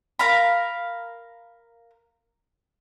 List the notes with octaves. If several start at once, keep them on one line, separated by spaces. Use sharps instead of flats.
A#4 F5 A#5 B5